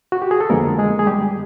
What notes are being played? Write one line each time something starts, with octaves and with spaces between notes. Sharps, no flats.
F#4
G4
G#4
A4
F2 D3 F3 G#3 A#3 B3 A#4
G#3 G#4
G#4
G3 G4